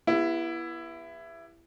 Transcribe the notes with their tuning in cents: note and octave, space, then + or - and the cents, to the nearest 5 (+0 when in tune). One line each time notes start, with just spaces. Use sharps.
B3 -25 E4 +20 G4 +30